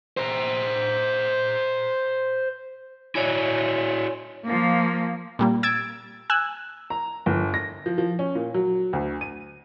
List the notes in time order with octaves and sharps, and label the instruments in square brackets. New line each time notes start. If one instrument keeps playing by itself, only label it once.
[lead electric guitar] C5 A#5
[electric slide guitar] E4 F#4 D5 [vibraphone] C#5 G#5
[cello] F3 A#3
[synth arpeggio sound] A#2 G3 A#3
E6 G#6 A6 D7
G#5 E6 F#6
[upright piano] A#5
G1
A#6
F3
F3
C#4
A#2
F#3
D2
D#7